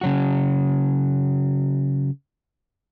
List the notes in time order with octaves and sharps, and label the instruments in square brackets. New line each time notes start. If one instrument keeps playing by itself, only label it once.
[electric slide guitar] C#3 F#3 F#4